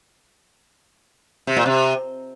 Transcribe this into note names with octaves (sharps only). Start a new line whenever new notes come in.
C3
A#2
C3